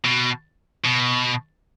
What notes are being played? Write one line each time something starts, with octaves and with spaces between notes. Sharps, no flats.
B2
B2